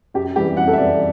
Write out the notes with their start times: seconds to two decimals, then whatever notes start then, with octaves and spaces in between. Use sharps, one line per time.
0.14 F#2 G4
0.36 E3 G3 G4
0.56 F#2 F#5
0.67 A4
0.73 E5
0.78 E3 G3 D5